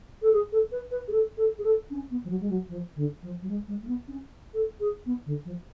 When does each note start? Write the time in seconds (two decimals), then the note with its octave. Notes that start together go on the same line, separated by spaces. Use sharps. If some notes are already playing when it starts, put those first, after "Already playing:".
0.22 A4
0.33 G#4
0.52 A4
0.72 B4
0.91 B4
1.08 G#4
1.12 A4
1.37 A4
1.58 G#4
1.63 A4
1.90 C#4
2.10 B3
2.24 F3
2.30 F#3
2.40 G#3
2.50 F#3
2.69 F3
2.96 D3
3.22 F3
3.42 F#3
3.49 G#3
3.67 G#3
3.82 A3
3.87 B3
4.08 C#4
4.54 A4
4.80 G#4
5.06 B3
5.26 D3
5.45 F3